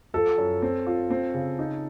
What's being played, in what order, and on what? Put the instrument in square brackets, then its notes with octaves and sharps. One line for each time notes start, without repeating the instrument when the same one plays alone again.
[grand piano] F3 [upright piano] A4
[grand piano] F#2
C4
F4
C4
C#3
D#4